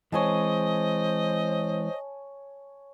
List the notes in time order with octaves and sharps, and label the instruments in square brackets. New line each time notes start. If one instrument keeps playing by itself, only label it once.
[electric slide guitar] E3 G#3 C4 [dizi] C5 [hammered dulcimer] C#5 G#5 A5 [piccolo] D#5